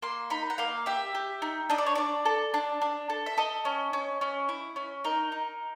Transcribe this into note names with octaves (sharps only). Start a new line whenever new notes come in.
A#3 C6
D#4 B5
F#5
A#3 F5
G4 E5
G4
D#4
D4 D#5
D5
C#5
D4 D5
A4
D4
D4
A4
E5
A4 D#5
C#4
C#4
C#4
E4
C#4
D#4 A#4
D#4